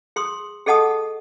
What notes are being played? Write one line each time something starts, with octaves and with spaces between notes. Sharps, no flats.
G#4 C6 D#6
G#4 A4 D#5 F#5 A5 D#6